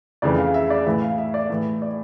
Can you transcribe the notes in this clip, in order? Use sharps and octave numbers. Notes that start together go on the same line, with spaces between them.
F2 C#3 E3 D5
F5
E5
D5
A2 E3 E5
F5
E5
D5
A2 E3
D5